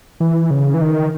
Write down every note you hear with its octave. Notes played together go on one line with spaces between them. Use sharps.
E3
C#3
E3
D#3